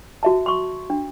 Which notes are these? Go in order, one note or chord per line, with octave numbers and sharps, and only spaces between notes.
F#4 E5 A5
C6 C#6
D4